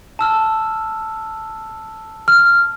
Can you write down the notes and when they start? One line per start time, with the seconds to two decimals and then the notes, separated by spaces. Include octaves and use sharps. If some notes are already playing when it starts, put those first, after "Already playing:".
0.19 A5 E6 F6
2.28 F6